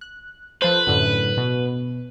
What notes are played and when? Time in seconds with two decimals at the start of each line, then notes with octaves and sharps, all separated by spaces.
0.01 F#6
0.62 F3 A4 B4 C5
0.87 F#2 A2 D3
1.37 B2